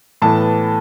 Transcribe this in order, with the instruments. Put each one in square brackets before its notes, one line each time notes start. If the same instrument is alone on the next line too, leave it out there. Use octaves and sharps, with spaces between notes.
[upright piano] A2 E3 B3 A5